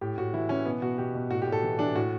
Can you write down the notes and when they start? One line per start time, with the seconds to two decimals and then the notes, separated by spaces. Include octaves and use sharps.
0.01 A2 G4
0.18 A2 F#4
0.33 E3 E4
0.49 E3 C#4
0.65 B2 B3
0.82 B2 F#4
0.98 B2 G4
1.15 B2
1.30 A2 F#4
1.42 G4
1.47 A2
1.52 A4
1.63 E3
1.79 E3 D4
1.95 A2 F#4